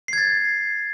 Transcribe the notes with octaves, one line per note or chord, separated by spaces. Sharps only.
G#6 A6 C7